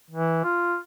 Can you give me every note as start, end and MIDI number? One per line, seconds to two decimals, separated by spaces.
0.10 0.42 52
0.44 0.77 65